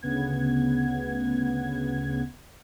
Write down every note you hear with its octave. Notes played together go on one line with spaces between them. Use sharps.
D2 C#3 B3 F#5 G#6